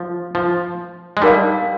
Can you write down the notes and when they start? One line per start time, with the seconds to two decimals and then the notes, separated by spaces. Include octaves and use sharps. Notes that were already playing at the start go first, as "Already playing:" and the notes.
Already playing: F3
0.35 F3
1.17 G#3
1.22 G3 D#4 A#4 D5 F5